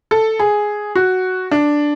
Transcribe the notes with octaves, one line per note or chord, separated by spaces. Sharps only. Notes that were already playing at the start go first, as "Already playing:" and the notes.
A4
G#4
F#4
D4